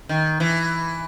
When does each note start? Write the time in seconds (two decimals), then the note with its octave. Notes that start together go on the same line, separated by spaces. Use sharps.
0.09 D#3
0.40 E3